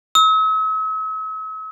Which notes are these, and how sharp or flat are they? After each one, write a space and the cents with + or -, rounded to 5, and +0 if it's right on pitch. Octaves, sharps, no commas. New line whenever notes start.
E6 -45